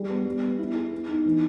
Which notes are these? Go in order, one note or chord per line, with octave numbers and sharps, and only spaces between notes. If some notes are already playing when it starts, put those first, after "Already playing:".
Already playing: G3 G#4
B3
G3
B3
E4
G#4
B3
D#4
E3